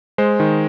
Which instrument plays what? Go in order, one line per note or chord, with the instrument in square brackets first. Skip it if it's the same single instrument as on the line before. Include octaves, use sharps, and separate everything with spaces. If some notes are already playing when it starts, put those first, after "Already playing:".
[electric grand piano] G#3 C5
D#3